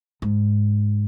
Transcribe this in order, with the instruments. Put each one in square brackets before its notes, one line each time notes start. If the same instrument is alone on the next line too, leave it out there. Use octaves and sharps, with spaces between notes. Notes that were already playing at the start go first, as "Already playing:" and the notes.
[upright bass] G#2